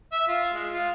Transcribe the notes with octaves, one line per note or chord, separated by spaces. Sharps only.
E5
F4
G#3
F4